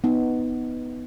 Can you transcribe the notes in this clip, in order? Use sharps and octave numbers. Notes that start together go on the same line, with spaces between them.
B3 D#4